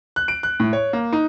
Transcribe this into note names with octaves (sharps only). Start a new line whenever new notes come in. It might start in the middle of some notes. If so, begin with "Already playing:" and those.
F#6
D7
F#6
A2
C#5
A#3
D#4